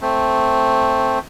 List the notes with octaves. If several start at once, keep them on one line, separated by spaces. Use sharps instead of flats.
A3 C4